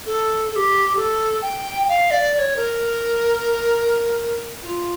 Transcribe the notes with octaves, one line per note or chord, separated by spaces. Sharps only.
A4
A4
G4
A4
G5
F5
D5
D5
C#5
A#4
F4